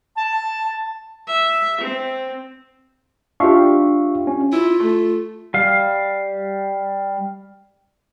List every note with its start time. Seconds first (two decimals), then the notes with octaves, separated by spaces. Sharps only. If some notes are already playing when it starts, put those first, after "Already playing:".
0.17 A5
1.28 E5
1.81 C4
3.40 D4 F4 G4 E5 F5 C#6
4.27 C#4
4.53 E4 F4
4.80 A3
5.54 G3 F5